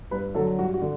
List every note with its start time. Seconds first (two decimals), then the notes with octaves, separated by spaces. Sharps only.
0.11 G2 B4
0.35 D3 F#3 A4
0.59 G2 F#4
0.74 F#4
0.82 D3